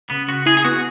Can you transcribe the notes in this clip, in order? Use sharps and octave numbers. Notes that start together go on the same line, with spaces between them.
C#3 B3
C#3 F#4
E4 G#4
G#4
B3 F#4